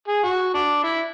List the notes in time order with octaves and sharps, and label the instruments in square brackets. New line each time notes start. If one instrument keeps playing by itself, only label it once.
[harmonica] G#4
F#4
D4
E4